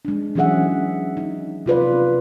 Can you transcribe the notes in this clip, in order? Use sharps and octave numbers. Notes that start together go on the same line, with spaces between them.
G#3 D4
E3 F#3 C#4 G#4 E5 F#5
D#4
C3 F4 B4 D5